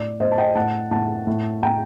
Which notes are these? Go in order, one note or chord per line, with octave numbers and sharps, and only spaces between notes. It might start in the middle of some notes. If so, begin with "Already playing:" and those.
Already playing: A2 D5
A2 C5 D#5
A5
D#5 G5
A2 F#5 A5
A2 F#5 A5
A2
A2 G5 A#5